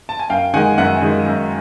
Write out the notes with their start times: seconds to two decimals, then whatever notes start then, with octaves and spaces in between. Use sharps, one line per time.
0.09 A5
0.19 G#5
0.30 F#2 F5 G5
0.54 D#3 G#3 F#5 G#5
0.78 F#2 E5 F#5
1.02 D#3 G#3
1.26 F#2